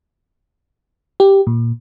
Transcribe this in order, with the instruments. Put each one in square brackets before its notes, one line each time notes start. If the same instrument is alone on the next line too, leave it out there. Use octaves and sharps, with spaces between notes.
[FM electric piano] G4
A#2